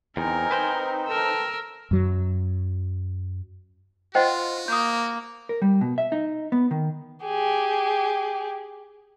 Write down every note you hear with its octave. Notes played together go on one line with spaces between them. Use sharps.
E2 C4 D#4 A#4 G#5
B4 C5 G5
A4 A#4 E6
F#2 F#3
F4 F#4 C5 D#5 F#5 G5 A6
A#3 D#6 G6
A#4
G3
B2
E5
D#4
B3
D#3
G4 G#4